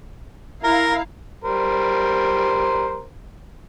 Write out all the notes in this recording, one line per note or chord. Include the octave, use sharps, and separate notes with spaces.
E4 A#4 F5 A#5
G3 A#4 C5